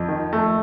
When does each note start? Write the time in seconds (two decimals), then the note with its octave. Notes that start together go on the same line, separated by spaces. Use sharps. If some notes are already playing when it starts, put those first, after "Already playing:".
Already playing: F2
0.08 D#3
0.33 A3